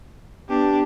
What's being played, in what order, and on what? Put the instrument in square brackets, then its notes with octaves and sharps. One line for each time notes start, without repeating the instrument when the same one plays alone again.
[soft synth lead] B3 [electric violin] D4 G4